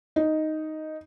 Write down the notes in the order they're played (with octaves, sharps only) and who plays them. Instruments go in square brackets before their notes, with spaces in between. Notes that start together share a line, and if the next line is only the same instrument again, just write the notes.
[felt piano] D#4